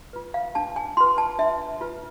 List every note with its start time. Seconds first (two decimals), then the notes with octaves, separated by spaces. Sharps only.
0.13 F4 B4
0.34 F5
0.55 D4 A5
0.76 G#5
0.97 F4 B4 C6
1.18 A5
1.39 D4 E5
1.81 F4 B4